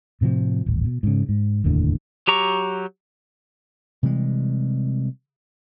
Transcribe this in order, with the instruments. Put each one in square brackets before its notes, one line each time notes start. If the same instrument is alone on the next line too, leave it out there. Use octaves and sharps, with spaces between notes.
[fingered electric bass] A2 C3 D#3 F3
D#1 A1
B2
G#2 C#3
G#2
F1 D#2 A2 D3
[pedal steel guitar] F#3 G4 A#5 C#6
[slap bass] C3 E3 G3 G#3